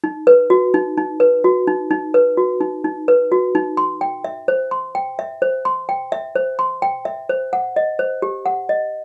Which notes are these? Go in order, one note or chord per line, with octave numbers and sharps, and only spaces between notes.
D#4
B4
F#4
D#4
D#4
B4
F#4
D#4
D#4
B4
F#4
D#4
D#4
B4
F#4
D#4
C6
G5
E5
C5
C6
G5
E5
C5
C6
G5
E5
C5
C6
G5
E5
C5
F#5
D#5
C5
G4
F#5
D#5